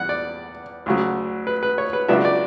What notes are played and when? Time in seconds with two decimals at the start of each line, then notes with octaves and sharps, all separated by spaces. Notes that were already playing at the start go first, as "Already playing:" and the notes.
Already playing: E2 G3 F#5
0.09 D5
0.86 D2 C#3 F#3
1.47 B4
1.63 B4
1.78 C#5
1.93 B4
2.08 C#2 C#3 F#3 B3 D4 E5
2.25 D5